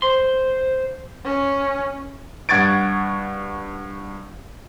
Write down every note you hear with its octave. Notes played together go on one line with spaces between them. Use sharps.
C5 C6
C#4
G2 F#5 C#6 G#6 A6 D7